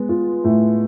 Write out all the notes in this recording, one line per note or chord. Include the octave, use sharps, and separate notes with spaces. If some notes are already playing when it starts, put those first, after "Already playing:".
Already playing: G#3 B3
F4
A2